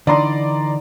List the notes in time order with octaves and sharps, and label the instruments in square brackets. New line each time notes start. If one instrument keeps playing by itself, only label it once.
[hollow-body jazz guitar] D3 E3 D#4 [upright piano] D5 A#5 C6